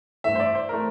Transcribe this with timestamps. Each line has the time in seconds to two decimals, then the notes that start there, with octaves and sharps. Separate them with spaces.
0.24 G2 E3 A3 E5
0.35 C5
0.40 D5
0.55 C5
0.69 E3 A3 A#4